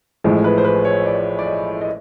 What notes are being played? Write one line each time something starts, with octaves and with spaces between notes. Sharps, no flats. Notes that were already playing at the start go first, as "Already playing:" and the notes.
A1 A2 F3 G#3
B4
C5
B4
C#5
D5
D5
D#5
D#5